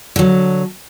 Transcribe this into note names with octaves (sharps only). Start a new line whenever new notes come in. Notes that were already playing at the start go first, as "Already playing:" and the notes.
D3 F#3